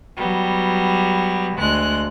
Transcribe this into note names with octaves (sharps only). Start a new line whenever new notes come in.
F#3 G3 B3
D2 G#3 F#6